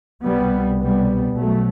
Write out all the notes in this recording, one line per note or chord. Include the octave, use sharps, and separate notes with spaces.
C2 B2 G3 B3
G3 B3
B1 B2 F#3 A3